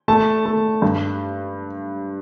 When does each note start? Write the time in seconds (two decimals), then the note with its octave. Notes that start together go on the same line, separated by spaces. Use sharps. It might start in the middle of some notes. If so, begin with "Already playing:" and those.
0.08 A3 A5
0.46 A3
0.82 G2